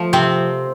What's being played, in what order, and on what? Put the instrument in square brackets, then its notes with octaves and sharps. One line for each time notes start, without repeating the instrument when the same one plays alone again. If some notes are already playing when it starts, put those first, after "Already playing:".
Already playing: [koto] F3 A3
C3 C4